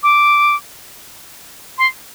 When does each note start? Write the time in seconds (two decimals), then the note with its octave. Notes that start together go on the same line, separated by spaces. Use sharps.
0.03 D6
1.78 C6